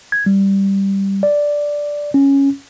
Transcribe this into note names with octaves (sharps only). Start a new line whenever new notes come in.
G#6
G3
D5
C#4